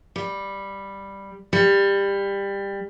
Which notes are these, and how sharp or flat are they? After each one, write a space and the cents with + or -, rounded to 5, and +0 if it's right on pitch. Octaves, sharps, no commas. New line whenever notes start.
G3 +5
G3 +20